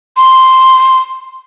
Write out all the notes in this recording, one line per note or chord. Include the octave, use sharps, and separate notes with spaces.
C6